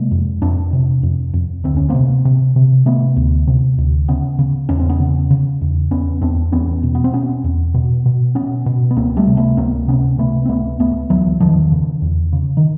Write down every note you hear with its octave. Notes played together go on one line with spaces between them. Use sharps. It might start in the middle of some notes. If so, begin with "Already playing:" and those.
Already playing: C3 G#3 A#3
F2
F2 C4 D4
C3
F2
F2
D2 C4
C#4
C3 A#3 C4
C3
C3
C3 A3 B3
D2
C3
D2
C#3 B3 C#4
C#3
E2 C#4
C4
B3 C#4
C#3
C#3
E2
E2 B3 C#4
E2 C4 D4
E2 B3 C#4
B2
B3
C4
B2 B3 C#4
E2
B2
B2
B2 B3 C#4
B2
B3
C#2 A#3 C4
G3 A3
C3
A3 B3
C#2 A#3 C4
C3 B3 C#4
C3 A3 B3
C4
C#2 A3 B3
C#2 A3 B3
C#2 E3 F#3
E2 D#3 F3
C#3
E2
C#3
D#3